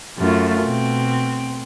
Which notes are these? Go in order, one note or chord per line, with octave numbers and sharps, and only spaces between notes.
F#2 A3 F4
B2 C4